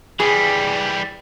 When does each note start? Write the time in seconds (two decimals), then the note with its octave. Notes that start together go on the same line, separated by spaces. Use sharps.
0.20 E3 G3 G#4